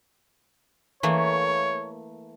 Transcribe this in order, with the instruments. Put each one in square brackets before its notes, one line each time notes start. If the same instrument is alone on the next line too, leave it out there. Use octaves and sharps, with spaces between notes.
[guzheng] E3 A3 A#3 [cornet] C#5